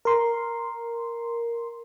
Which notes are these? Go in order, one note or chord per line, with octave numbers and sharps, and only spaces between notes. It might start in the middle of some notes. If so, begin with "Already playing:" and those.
A#4 C6